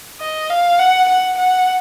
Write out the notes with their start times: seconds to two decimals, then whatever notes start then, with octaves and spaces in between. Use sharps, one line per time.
0.20 D#5
0.50 F5
0.79 F#5
1.09 F#5
1.37 F#5